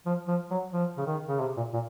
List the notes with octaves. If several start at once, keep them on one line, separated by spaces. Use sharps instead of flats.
F3
F3
F#3
F3
C#3
D#3
C#3
C3
A#2
A#2